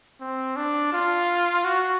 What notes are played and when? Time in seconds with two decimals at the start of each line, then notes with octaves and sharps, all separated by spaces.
0.21 C4
0.56 D4
0.93 F4
1.64 F#4